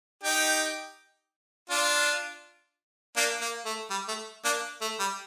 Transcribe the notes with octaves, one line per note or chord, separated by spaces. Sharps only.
D#4 G4
D4 F4
A#3 D4
A#3
A3
G3
A3
A#3 D4
A3
G3